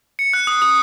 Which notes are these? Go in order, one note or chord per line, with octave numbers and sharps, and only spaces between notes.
C#7
F#6
D#6
D#6